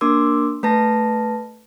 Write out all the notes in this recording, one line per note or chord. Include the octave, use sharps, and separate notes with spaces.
A#3 D4 A#4 C6 D6 E6
A3 B4 A5 A#6